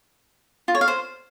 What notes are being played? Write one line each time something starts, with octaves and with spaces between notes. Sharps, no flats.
F4
C#5
F5
C5